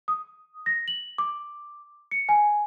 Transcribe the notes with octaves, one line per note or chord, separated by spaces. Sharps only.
D#6
A#6
F#7
D6
C#7
G#5